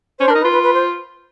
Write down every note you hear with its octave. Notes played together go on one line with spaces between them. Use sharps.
C#4 C5
D4
A#4
D#4
B4
F4
B4
B4
C5